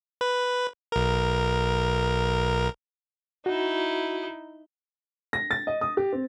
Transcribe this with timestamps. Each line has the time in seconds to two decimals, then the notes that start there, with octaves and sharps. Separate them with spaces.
0.21 B4
0.92 B1 A#4
3.46 D#4 E4 F#4
5.33 A#6
5.51 A6
5.67 D#5
5.81 D#6
5.97 G4
6.13 C4